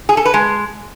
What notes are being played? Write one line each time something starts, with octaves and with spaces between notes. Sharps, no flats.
G#4
A4
B4
G#3